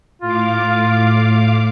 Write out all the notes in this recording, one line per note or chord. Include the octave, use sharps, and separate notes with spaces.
A2 F4 F5 D6